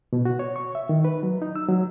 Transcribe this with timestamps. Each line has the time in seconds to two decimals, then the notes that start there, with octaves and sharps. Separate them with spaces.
0.13 B2
0.25 F#4
0.39 C#5
0.56 C#6
0.75 E5
0.89 D#3
1.05 B4
1.23 F#3
1.42 D#4
1.56 E6
1.69 F#3